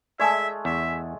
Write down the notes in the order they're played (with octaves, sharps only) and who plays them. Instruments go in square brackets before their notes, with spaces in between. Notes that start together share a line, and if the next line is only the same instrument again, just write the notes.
[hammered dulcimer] G#3 A3 [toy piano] D5 G#5 A5 [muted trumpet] E5
[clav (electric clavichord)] E2 [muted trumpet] E5